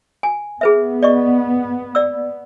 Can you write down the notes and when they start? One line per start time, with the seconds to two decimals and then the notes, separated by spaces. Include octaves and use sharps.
0.23 G#5
0.61 B3 G#4 B4 E5
1.02 D5 D#5 C#6
1.95 D5 E6